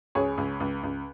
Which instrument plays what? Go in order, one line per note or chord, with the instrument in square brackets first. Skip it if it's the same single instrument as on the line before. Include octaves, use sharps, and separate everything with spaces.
[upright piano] C#2 G#4 C#5
C#2
C#2
C#2